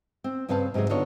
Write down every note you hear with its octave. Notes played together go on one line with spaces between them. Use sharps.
C4
G2 C#3 C4 B4 F5 A5
G#2 C3 F#3 G#4 D#5
D3 B3 D4 D#4 F4 C#5